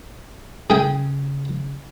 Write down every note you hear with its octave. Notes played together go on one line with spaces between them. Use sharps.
C#3 G#4 G5 G#5